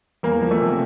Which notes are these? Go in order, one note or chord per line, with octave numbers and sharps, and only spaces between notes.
E2 A#3
F3
A3
C3